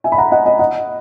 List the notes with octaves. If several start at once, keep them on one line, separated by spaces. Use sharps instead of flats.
E5 G#5
B5
F#5 A#5
D#5 F#5
D#5 F#5
D#5 F#5